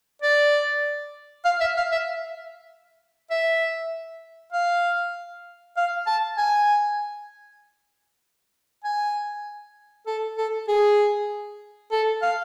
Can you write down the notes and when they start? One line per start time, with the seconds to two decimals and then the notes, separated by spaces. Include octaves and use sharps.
0.22 D5
1.45 F5
1.60 E5
1.76 F5
1.92 E5
3.30 E5
4.52 F5
5.77 F5
6.07 A5
6.38 G#5
8.84 G#5
10.07 A4
10.38 A4
10.68 G#4
11.92 A4
12.22 F5